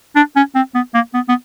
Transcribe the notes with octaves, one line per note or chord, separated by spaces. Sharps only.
D4
C#4
C4
B3
A#3
B3
B3